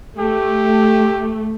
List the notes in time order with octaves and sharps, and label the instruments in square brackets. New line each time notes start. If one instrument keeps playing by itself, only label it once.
[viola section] A3 [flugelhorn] G4